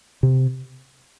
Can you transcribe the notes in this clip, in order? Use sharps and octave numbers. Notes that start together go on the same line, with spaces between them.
C3